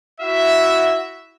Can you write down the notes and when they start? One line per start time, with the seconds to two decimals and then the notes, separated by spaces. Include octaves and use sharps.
0.20 E4 F#4 E5